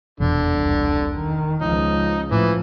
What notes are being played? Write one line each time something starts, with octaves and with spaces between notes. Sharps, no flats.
F1 E2 B2 D3
C2
D#3
C#2 F3 D#4
A2 E3 F3